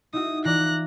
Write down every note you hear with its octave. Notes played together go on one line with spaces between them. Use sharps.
D#4 E4 F#4 D#6
E3 F4 D5 A#5 F#6